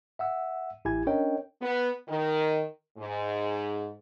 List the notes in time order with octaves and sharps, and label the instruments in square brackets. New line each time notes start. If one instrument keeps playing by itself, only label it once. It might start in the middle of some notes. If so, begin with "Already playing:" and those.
[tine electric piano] E5 F#5 E6
A1 E4 G4 G#5 G#6
C#4 D4 A#4 C#5 D#5 G5
[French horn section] B3
D#3
G#2